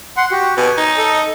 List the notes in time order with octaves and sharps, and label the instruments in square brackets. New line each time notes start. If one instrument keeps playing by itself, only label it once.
[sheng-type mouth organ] F#5 C6
F#4 G4
[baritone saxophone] B2 [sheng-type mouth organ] G#5
[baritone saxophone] D#4
[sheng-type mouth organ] A4 D#5